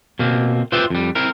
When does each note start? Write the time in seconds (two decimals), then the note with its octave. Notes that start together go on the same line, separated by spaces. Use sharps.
0.19 B2 A#3 C4
0.72 F4 B4 C5 D5 E5 G5
0.90 F2 G3
1.15 C4 E4 A#4